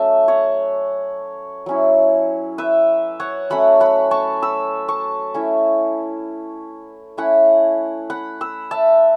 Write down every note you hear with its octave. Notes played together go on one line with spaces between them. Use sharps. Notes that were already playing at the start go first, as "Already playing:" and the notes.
Already playing: F#3 A3 C#4 E5 A5
C#5 F#5
F#3 C#4 E4
B4 E5
C#5 F#5
F#3 A3 C#4 F#5 B5
F#5 B5
A5 C#6
B5 E6
A5 C#6
A3 C#4 E4
A3 C#4 E4 F#5 B5
F#5 B5
B5 E6
E5 A5